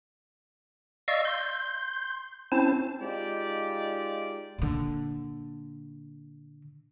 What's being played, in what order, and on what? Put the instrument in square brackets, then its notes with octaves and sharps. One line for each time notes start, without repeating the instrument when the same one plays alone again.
[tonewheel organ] D5 D#5 F5 C#6 E6
C6 G6
C4 C#4 E4 C5 A5
[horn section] G#3 D#4 F4 G4 D5
[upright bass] A#2 D3